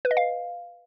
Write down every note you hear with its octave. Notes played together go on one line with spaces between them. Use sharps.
B4
D#5
F5